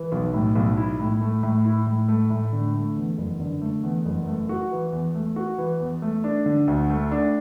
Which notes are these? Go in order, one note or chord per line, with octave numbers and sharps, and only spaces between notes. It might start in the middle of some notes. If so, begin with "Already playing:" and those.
Already playing: E3
B1
A2
B1
E4
A2
A3
A2
E4
A2
A3
A2
D3
A3
E2
F#1
D3
A3
E2
F#1
A3
F#4
E3
E2
A3
F#4
E3
E2
A3
D4
D3
D2
A3
D4